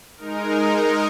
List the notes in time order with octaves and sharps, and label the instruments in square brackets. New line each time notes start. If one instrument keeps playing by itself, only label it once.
[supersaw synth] G#3 D#4 A#4